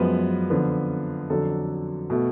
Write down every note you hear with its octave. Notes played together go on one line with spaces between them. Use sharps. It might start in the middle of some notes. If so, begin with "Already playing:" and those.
Already playing: F#2 F3 G#3 B3 B4
F2 D3 F3 B3
F2 D3 F#3 A4
B2 A3